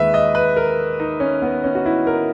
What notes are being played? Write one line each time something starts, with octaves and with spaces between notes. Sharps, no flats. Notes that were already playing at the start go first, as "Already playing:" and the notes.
Already playing: D#2 D#3 G#3 B4 E5
D#5
B4
A#4
D#4
C#4
B3
C#4
F#4
E4
A#4